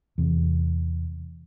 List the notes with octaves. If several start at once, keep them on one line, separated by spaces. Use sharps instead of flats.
E2 C3